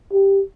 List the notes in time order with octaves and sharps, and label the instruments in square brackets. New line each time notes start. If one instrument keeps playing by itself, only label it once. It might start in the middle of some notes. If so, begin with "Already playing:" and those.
[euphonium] G4